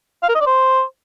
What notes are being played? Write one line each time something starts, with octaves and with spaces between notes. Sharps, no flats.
F5
A#4
D#5
D5
C5